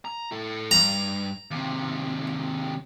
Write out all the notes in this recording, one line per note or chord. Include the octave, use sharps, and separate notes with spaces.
A#5
E4 A4
G2 A#5
D#2 C3